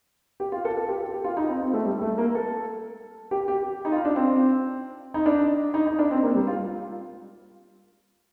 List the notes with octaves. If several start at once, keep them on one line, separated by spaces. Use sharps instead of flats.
G4
F4
A4
A4
G4
A4
G4
F4
D#4
C4
C4
A3
G3
A3
A#3
A4
G4
G4
D#4
F4
D4
C4
D#4
D4
D#4
D#4
D4
C4
A#3
G3
F4